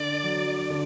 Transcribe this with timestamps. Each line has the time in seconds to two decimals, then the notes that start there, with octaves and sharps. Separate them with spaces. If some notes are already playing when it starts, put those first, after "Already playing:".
Already playing: D3 D5
0.23 F#3
0.70 D3